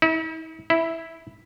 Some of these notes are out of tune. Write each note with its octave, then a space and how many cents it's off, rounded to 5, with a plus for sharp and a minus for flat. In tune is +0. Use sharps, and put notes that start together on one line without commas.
E4 -45
E4 -5